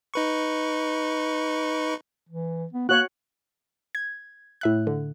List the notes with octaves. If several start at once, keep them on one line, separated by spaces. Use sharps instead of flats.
D#4 B4 C#6
E3
B3
A#3 F#4 C#5 F#6
G#6
A2 E5 F#6
D3